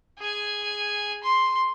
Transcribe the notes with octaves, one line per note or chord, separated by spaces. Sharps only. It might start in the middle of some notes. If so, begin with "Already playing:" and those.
G#4 G#5
C6